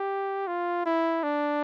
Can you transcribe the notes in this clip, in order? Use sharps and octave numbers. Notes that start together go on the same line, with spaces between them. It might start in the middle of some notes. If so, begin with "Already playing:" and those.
Already playing: G4
F4
E4
D4